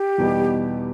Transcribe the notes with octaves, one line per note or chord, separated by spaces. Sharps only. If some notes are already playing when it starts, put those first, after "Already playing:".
Already playing: G4
E2 B2 G3 B3 D#4